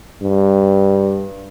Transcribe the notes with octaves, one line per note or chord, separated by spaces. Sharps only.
G2